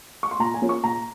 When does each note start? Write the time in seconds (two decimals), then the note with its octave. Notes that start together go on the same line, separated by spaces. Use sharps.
0.23 C#6
0.31 C6
0.39 A#2 A#5
0.54 G#5
0.62 F3 A#3 C#4 F4
0.69 C#6
0.83 A#2 A#5